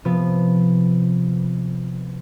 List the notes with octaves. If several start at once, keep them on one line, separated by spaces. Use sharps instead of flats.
C3 F3 B3